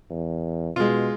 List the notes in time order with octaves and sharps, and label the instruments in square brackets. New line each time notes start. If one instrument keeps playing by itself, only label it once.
[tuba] E2
[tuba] B2 [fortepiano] G#3 F4